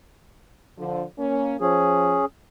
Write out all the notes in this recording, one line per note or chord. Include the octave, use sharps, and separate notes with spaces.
D3 F3
A#3 C#4
F3 C#4 G#4